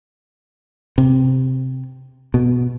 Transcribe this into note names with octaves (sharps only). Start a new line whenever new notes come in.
C3
B2